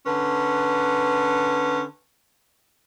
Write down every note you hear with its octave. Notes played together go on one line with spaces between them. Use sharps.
D3 C#4 B4